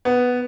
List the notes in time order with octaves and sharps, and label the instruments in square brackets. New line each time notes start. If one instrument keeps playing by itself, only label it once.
[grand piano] B3